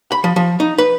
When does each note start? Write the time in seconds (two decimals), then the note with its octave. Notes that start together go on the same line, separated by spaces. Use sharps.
0.12 B5
0.24 F3
0.36 F3
0.60 D#4
0.78 B4